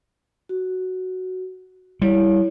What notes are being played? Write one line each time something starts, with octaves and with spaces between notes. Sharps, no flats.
F#4
G3 E4 C#5